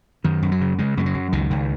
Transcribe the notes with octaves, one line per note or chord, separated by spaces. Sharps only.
F#2 D#3
F#2
F#3
C#3
C#3 G#3
F#2 G#3
F#3
F#2
C#2 D#3
C#2